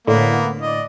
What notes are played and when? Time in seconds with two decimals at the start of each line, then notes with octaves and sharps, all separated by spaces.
0.07 A2 D3 A#3 B3
0.62 D5 D#5